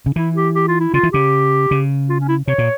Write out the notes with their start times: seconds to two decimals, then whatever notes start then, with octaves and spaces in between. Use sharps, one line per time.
0.06 C#3
0.16 E3 E4
0.36 G4
0.55 G4
0.68 F4
0.80 E4
0.93 C#3 F4
1.03 E3
1.13 C#3 G4
1.71 C#3
2.09 F4
2.20 C#4
2.28 E4
2.48 C3 C#5
2.58 A#2